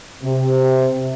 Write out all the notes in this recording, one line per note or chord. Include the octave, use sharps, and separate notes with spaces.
C3